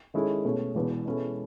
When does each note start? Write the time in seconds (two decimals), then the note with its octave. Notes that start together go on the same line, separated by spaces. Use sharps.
0.14 D#3 G#3 C#4 E4 A4
0.45 B2 A3 C#4 G#4 C#5
0.75 E1 E2 B2
1.06 B2 G#3 C#4 E4 A4